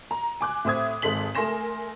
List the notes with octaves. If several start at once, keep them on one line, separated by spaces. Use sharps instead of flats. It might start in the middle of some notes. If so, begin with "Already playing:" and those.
A#5
G#5 D6 F#6
A2 C4 E5 D#6 G#6
G#1 G#3 A4 B6 F#7
A3 A#4 G#5 C6 A#6 E7